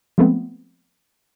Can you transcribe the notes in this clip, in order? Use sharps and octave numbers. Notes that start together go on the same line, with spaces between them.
F3 G#3 A3 B3 C4